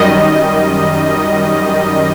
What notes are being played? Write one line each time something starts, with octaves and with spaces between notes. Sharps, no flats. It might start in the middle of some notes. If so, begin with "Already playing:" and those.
Already playing: F#2 D#3 G3 D#5